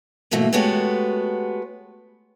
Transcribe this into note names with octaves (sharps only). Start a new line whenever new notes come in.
G#2 B2 E3 F#3 A3 A#3
G#3 A3 B3 F#4 G4 C#5